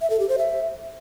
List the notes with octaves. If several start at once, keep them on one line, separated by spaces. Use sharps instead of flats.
E5
A4
G4
C5
E5